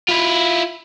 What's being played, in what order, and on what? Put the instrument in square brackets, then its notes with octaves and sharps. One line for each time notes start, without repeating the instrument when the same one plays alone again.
[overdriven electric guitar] E4 F4